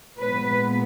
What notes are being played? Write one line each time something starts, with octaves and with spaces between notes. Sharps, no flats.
A#2 G#3 B3 B4